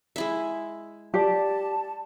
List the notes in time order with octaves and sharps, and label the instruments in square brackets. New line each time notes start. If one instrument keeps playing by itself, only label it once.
[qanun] G#3 E4 E5
[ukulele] G4 D5 [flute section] A5